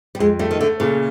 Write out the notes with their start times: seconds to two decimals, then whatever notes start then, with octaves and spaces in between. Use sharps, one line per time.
0.15 G3
0.19 F2 G#3
0.39 G3 A3
0.51 D#3
0.60 D3 A3
0.80 A#2 C#3